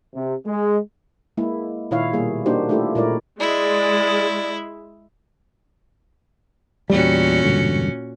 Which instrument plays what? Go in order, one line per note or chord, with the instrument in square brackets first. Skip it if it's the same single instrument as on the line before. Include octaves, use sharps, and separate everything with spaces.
[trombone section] C3
G#3
[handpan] G#3 A#3 E4
A#2 D#3 E4 C#5 F5
B2 G3 A#3 G#4
A#3 D4 D#4 F#4 G4 C5
A3 D4 E4 F4 G4 A4
A#2 G#3 E4 A#4 C#5 D5
[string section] G#3 [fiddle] E4 [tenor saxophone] D5
[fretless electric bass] E2 G3 [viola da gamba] A#2 C#4 F#4
[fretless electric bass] E1 G2 D3